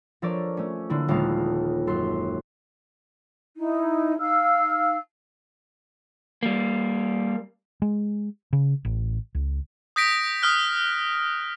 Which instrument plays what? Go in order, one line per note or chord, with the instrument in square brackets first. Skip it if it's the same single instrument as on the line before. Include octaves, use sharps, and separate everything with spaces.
[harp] F3 D4 A4 A#4 C#5 D5
A3 C#4
D3 A#3 E4
D#1 D#2 G#3 B3 F5 A5
F#2 A4 C6
[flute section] D#4 E4
D#4 F5 E6 F6
[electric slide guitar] G3 A#3
[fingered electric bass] G#3
C#3
A1
C#2
[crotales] D#6 G6 A#6 B6 D7
D#6 F6 F#6